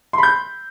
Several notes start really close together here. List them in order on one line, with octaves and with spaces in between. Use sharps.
C6 B5 G6